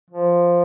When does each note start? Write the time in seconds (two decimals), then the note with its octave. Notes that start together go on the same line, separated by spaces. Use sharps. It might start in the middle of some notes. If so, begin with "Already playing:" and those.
0.10 F3